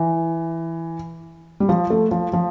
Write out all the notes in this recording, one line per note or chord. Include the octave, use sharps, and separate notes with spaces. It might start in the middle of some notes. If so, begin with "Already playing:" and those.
Already playing: E3
G3
F3
A3
F3
F3